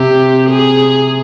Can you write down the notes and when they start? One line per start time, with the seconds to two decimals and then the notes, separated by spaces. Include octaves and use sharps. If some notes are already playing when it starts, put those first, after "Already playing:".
Already playing: C3 C4 G4
0.50 G#4